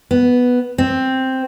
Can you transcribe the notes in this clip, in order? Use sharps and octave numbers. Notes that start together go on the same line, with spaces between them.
B3
C4